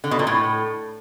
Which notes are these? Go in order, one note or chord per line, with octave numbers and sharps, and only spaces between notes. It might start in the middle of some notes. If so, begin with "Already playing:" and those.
D3
B2
A#2
A2